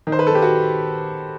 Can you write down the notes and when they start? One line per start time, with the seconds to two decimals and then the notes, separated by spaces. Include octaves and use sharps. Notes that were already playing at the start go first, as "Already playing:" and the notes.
0.07 D#3
0.12 C5
0.19 B4
0.27 A4
0.30 D#3 G4
0.42 F#4